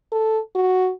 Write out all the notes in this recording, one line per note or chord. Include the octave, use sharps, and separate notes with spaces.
A4
F#4